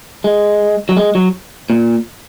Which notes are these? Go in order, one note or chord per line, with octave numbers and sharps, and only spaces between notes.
G#3
F#3
G#3
F#3
A#2